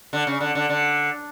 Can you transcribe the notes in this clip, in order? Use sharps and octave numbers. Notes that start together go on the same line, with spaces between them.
D3
C#3
D3
D3
D3